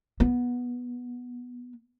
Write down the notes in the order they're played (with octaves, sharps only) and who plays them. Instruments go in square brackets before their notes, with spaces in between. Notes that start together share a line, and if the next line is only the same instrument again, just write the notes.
[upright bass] B3